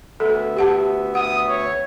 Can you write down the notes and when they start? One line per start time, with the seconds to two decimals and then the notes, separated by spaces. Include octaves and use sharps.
0.20 D2 B3 A4 E5
0.57 G4 F#5 A5
1.15 F#5 D#6
1.48 C#5